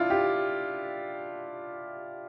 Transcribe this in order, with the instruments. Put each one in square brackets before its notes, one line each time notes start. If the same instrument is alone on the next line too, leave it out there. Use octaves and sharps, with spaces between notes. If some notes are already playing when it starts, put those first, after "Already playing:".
Already playing: [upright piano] D4 E4 F4
G4